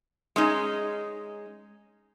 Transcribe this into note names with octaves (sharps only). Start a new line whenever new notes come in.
G#3 C#4 D#4